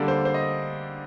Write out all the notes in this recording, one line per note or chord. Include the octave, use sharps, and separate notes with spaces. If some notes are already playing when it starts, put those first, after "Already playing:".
Already playing: D3 G3 A#3 A4
C5
C5
D#5